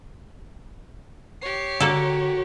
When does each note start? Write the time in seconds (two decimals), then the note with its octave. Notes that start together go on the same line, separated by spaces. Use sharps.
1.41 G4 C#5 C7
1.80 D3 A#3 F#4 A4